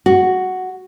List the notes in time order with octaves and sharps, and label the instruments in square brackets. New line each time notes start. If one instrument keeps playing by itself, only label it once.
[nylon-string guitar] F#4